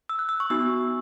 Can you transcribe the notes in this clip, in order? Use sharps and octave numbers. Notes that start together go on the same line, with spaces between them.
E6
F#6
E6
C#6
B3 D#4 F#4 E6